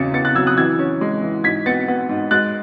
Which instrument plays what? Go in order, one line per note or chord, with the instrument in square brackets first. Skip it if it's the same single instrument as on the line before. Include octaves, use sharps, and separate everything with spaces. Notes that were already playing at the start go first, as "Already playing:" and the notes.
Already playing: [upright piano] E2 C#3 A6 C#7
B3 A6 C#7
F#6 A6
F#3 E6 G#6
D#6 F#6
E3 E6 G#6
C#4
G#3
E3
G#2 G#6 B6
B3 A6 C#7
B3
G#2
G#3 F#6 A6